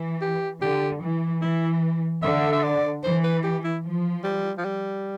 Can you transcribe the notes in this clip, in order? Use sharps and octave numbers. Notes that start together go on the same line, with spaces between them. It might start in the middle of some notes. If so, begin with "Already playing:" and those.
Already playing: E3
G4
D3 G4
E3
E3 E4
D3 E5
E5
D5
E3 C5
B4
G4
E4
F3
G3
F3
G3